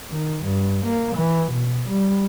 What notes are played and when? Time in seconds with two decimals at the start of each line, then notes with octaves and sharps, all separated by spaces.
0.11 D#3
0.44 G2
0.86 A#3
1.16 E3
1.53 B2
1.89 G3